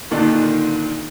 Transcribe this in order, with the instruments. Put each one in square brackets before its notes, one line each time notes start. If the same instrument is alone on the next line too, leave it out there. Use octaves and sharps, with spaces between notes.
[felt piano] A#2 D3 D#3 D4 D#4 F4